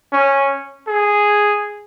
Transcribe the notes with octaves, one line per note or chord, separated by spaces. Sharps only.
C#4
G#4